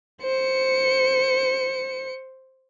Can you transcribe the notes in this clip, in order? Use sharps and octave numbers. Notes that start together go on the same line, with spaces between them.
C5 C#7